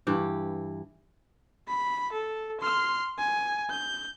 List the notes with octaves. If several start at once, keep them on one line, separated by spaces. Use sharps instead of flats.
G2 E3 G4
B5
A4
C6 F6
G#5
G6